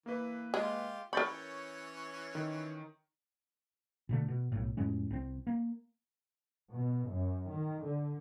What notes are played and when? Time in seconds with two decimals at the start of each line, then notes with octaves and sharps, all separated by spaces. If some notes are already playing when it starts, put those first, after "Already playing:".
0.06 E3 A#3 B4
0.54 G#3 F4 G4
1.13 E3 C#4 A#4 C#5 B5 C#6 G6 A6
2.35 D#3
4.09 B2 D3 A3
4.28 B2
4.52 B1 A2
4.77 F2 A2 G#3 C#4
5.11 C2 C4
5.47 A#3
6.71 B2
7.07 F#2
7.50 D#3
7.84 D3